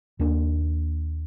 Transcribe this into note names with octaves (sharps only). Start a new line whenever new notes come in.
D#2 A#3 D4